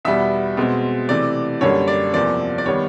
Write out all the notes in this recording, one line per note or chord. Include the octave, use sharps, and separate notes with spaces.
E2 B2 G3 B3 E5
B2 G#3 C4
C3 E3 A3 D5
F#2 D3 G3 A#3 C#5
D5
E2 C3 F3 A#3 D5
D5
D#3 G3 B3 C#5